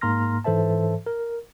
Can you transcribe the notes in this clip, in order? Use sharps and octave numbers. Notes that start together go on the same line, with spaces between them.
G#2 A#3 A#5 C6 F6 A#6
G#2 E3 A4 C5 E5 A5
A#4